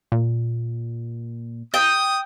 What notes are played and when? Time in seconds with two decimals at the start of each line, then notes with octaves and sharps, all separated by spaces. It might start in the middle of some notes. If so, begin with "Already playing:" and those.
0.12 A#2
1.74 G5 D#6